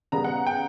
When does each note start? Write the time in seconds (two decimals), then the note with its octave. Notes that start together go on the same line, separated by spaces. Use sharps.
0.12 C#3 G3 B3 A#5
0.24 F#5
0.47 G5